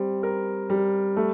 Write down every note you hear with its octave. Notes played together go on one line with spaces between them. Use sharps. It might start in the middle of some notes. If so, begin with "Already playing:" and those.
Already playing: G3 C4
A#4
G3
A3